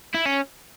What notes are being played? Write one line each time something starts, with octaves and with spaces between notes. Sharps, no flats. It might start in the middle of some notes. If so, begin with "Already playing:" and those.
E4
C#4